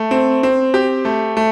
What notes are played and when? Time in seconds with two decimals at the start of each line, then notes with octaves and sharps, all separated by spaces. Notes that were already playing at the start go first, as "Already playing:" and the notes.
Already playing: A3
0.11 C4
0.43 C4
0.74 G4
1.05 A3
1.37 A3